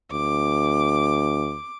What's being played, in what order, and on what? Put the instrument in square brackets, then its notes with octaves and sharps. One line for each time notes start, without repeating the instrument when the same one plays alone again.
[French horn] D2 [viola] D6